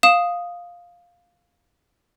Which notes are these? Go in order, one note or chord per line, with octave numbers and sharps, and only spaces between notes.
F5 D#6 E7